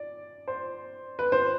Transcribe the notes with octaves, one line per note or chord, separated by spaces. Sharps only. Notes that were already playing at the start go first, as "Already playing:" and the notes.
Already playing: D5
C5
B4
C5